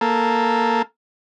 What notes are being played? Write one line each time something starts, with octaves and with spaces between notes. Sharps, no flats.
A#3 A4